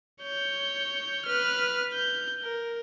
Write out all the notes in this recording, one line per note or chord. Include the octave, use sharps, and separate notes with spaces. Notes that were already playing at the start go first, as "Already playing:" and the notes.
C#5 G6
B4 F6
G6
A#4